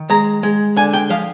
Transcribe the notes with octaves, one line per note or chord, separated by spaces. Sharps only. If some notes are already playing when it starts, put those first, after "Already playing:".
Already playing: D#3
G#3 A#5
G#3
D3 G#5
G5
F3 F5